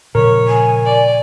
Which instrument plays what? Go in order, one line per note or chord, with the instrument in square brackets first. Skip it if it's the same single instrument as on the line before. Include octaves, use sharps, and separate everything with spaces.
[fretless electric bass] A#2 C#3 F3 [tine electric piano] A#4 [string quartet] C#5
[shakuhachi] G#5
[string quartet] D5